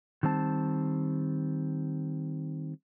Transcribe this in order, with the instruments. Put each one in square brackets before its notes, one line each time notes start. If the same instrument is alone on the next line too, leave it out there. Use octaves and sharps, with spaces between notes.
[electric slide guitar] D#3 G3 C4 A5